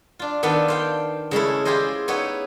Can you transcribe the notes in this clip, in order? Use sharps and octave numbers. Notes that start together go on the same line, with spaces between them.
D4 F4
D#3 B3 D4 F4 A4
C5 F5 G5
C#3 G#3 A3 E4
E4 F4 G4 G#4 C5 D#5
B3 D#4 E4 C#5